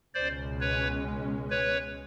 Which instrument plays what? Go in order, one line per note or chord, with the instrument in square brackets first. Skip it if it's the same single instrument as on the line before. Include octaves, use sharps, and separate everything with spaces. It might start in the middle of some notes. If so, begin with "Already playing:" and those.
[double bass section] C#2 B2 G#3 C#4 [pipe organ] C5 D5
[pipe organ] B4 C#5
B4 C#5